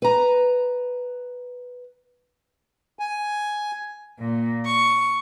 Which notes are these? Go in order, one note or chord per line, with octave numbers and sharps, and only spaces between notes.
B4 A#5
G#5
A#2
C#6